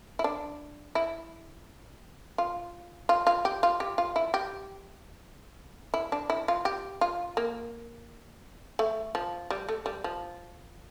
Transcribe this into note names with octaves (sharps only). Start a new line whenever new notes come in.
E4
D4
E4
F4
F4
F4
G4
F4
G4
F4
E4
G4
E4
D4
E4
F4
G4
F4
A#3
A3
F3
G3
A3
G3
F3